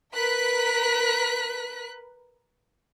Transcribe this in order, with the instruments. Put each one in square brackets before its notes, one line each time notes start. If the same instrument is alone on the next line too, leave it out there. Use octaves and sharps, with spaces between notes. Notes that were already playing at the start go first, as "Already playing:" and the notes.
[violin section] A#4 B4 F#6 B6